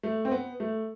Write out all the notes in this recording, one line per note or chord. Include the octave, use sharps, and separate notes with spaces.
A3
C4
B3
A3